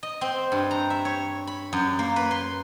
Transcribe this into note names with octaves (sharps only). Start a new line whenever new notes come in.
D#5
C4
G2
A#5
E5
C#5
B5
F#2
A#3
B4
C6